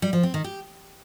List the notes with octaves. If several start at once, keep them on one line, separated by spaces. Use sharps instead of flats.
G3
F3
C4
D#3
G4